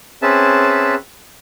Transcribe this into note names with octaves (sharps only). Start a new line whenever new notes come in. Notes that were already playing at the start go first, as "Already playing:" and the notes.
C4 C#4 G#4 B4 E5 A5